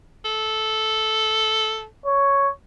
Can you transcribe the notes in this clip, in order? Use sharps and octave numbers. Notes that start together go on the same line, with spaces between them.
A4
C#5